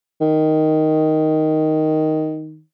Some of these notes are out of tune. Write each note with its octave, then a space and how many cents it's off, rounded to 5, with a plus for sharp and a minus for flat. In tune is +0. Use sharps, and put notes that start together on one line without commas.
D#3 +5